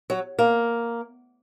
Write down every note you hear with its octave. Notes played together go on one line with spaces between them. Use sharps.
F#3
A#3